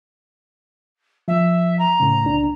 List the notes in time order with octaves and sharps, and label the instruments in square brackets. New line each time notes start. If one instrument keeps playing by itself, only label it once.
[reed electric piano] F3 [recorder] E5
[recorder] A#5
[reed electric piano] A2 C#3
C2 D4